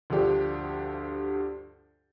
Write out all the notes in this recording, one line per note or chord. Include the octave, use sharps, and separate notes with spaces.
D2 G2 F3 D4 G4